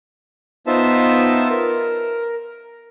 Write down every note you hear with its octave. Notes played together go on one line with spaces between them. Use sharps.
B3 D#4 F4 C5 E5 A5
A#4